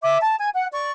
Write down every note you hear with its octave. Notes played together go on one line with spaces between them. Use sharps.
E5 D6
A5
G#5
F#5
D5 C#6